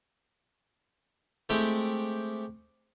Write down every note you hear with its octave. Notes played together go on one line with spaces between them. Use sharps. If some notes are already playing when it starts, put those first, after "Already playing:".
G#3 A3 C4 E4 G4